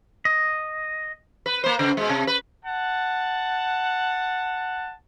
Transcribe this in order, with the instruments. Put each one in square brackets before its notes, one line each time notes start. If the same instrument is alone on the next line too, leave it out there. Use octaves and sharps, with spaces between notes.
[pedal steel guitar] D#5
[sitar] B4
A#3 C5
C#3
B2 G#3
C3
B4
[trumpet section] F#5 A5